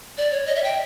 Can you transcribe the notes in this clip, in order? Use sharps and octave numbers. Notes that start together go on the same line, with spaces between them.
D5
C#5
D#5
E5
G5